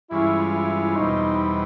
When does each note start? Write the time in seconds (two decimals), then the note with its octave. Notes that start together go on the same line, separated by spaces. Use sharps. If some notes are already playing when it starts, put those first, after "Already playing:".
0.10 G2 E3 G#3 C#4 E4 F4
0.53 E4
0.95 E2 B2 G3 C4 D#4